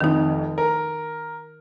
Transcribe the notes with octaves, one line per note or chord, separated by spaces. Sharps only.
F1 F2 D#3 D#4
A#4